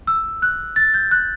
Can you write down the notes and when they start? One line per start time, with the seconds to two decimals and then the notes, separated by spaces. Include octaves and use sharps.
0.07 E6
0.42 F#6
0.76 A6
0.94 G6
1.11 F#6